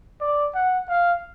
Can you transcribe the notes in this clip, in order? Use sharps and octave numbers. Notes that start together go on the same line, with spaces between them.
D5
F#5
F5